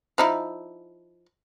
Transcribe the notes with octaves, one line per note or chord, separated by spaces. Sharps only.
F3 D#4 E4